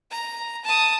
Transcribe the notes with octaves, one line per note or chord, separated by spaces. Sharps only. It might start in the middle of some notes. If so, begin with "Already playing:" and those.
A#5
A5 D#6